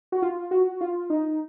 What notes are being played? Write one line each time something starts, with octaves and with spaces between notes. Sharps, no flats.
F#4
F4
F#4
F4
D#4